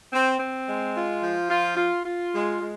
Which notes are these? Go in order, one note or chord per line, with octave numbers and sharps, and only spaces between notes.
C4
C4
G#3
F4
F3
F4
F4
F4
G#3
G#3